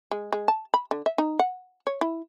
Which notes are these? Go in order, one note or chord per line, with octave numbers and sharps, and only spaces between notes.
G#3
G#3
A5
B5
D3
E5
D#4
F#5
C#5
E4